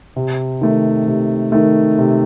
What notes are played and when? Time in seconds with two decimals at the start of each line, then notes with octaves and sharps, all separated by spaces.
0.16 C3
0.61 D#3 A3
1.07 C3
1.52 D#3 A3
1.98 C3